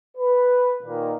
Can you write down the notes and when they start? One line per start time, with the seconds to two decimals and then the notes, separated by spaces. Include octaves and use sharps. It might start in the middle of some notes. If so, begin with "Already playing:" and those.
0.17 B4
0.83 A#2 D#3 A#3